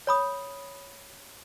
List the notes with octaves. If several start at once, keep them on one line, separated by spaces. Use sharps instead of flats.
C#5 B5 D#6